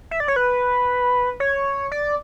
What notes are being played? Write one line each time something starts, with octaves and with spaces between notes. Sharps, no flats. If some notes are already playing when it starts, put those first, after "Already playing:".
E5
D5
C#5
B4
C#5
D5